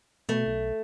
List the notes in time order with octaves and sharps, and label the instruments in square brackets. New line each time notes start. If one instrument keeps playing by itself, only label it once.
[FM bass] B2 [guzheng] A3
[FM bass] B1